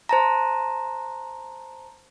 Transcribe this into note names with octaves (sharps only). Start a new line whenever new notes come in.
C5 A5 A#5